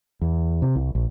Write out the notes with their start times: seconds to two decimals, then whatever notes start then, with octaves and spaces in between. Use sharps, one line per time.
0.21 E2
0.62 C3
0.76 C2
0.95 A#1